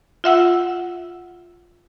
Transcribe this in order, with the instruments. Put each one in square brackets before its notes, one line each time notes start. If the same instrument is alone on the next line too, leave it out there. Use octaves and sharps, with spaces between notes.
[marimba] F4 E5 F#5 E6